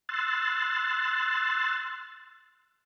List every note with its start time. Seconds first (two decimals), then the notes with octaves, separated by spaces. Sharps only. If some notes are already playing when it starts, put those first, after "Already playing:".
0.09 C6 E6 F#6 A6